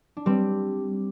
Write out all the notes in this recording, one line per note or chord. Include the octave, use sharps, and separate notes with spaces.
D4
G3 C4